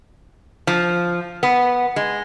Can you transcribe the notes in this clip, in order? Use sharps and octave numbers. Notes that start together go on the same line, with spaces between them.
F3
B3
G#3